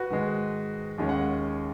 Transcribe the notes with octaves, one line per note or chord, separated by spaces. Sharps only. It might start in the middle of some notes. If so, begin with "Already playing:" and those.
Already playing: F#4 B4
G#2 D#3 G#3
D#2 D#3 G#3 C#4
F#5